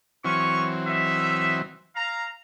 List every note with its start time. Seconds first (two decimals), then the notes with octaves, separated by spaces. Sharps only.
0.25 E3 F#3 C4 C#4 C#6
0.86 D#4 E5
1.96 F5 A#5